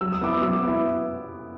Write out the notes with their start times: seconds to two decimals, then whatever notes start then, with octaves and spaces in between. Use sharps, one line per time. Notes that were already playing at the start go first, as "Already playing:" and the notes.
0.01 F#3 E6
0.12 D#6
0.21 B3 E4 D6 E6
0.42 F#3 D6 E6
0.63 B3 E4